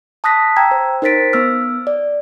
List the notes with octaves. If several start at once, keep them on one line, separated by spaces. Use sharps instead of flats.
A5 D#6 F#6 A#6 B6
G5 A#5 E6 G#6
C5
D#4 A#4 C5 A6 B6 D7
B3 E6 F6
D5